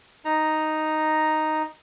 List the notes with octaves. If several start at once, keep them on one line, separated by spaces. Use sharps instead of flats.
D#4 A#5